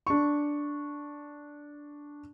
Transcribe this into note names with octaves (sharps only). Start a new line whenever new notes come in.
D4 C#6